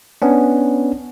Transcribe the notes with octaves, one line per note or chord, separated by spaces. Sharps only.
B3 C#4 D4